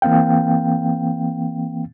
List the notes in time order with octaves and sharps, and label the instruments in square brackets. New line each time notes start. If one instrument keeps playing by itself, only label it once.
[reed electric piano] E3 A#3 C4 F5 G5